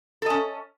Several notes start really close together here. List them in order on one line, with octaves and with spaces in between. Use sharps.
A4 D#5 C#4